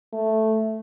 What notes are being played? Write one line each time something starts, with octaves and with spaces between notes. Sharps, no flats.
A3